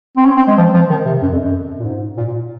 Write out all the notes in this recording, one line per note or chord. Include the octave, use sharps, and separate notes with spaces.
C4
C#4
C4
G#3
F3
F3
D#3
C3
F#2
F2
F#2
A#2
G#2
A#2
A#2